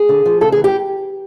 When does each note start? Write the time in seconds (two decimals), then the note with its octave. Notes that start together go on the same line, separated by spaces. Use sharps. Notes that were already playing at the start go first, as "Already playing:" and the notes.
Already playing: G#4
0.09 D3
0.26 F3
0.41 C#3 A4
0.52 E3 G#4
0.64 G4